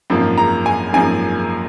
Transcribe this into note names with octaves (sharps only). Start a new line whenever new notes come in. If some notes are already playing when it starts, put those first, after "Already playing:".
G#1 F#2 F3 A#3
A#5
G#5
G#1 F#2 F3 A#3 G#5